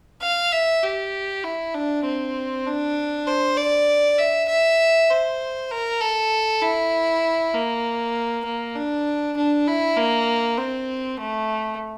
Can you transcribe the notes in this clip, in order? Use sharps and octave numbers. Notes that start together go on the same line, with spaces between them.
F5
E5
G4
E4
D4
C4
D4
C5
D5
E5
E5
C5
A#4
A4
E4
A#3
A#3
D4
D4
E4
A#3
C4
A3